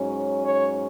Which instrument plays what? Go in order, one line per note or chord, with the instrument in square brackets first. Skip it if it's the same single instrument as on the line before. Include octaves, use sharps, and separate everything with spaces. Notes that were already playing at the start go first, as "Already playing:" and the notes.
Already playing: [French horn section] G#2 F#3 C#4
C#5